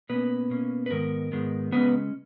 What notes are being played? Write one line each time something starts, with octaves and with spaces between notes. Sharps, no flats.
B2 A#3 B3 C#4 B4
B2 A#3 C#4
B4
G#2 D#3 G#3 B3 A#4
G#2 D#3 G#3 B3
C#3 G#3 B3 C#4 B4